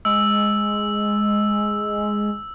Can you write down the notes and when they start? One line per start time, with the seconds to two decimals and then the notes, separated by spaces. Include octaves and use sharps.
0.05 G#3 E6